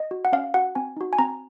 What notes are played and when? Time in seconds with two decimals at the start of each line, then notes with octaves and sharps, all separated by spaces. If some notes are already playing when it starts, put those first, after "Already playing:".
Already playing: D#5
0.11 F#4
0.25 F#5
0.32 C#4 F5
0.54 F#4 F#5
0.75 C4 G#5
0.97 D#4 F#4
1.13 G#5
1.18 C4 A#5